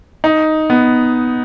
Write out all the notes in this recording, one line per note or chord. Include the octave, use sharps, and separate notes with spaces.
D#4
B3